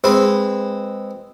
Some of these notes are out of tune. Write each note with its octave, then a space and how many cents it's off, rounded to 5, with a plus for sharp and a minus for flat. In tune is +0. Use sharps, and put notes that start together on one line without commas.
G#3 -15 C4 +0 B4 +0